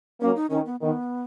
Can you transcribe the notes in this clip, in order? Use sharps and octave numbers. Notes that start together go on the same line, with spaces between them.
F#3 A#3 C#4
D#4
D#3 C#4
B3
D#3 B3